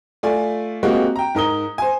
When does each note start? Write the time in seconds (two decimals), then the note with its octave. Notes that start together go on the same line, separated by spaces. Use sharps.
0.23 A3 F4 D5 G#5
0.83 G#3 A#3 C4 F#4 G4
1.16 G5 A#5
1.35 G#2 A#4 D#6 G7
1.78 C5 G#5